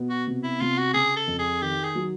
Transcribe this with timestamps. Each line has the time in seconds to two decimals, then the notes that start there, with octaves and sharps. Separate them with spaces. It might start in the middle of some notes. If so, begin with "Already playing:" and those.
Already playing: B2 B3
0.10 F#4
0.27 C3
0.43 E4
0.61 C3 F4
0.78 F#4
0.94 C#3 G#4
1.16 A4
1.27 F2
1.39 G#4
1.62 D#3 G4
1.84 G#4
1.95 F#3